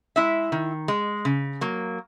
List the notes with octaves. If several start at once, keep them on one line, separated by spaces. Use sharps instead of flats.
G#3 E4 E5
D#3
G#3
C#3
F#3 A#3